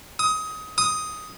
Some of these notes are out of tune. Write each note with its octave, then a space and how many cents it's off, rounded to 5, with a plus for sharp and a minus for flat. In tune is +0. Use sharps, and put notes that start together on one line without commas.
D#6 +20
D#6 +5